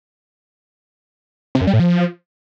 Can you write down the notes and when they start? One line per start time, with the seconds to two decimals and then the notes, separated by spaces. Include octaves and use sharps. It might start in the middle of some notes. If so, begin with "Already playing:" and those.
1.55 C3
1.61 F#2
1.67 G3
1.73 A2
1.80 F3